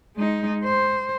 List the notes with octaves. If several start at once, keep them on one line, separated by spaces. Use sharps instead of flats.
G#3 D#4
C5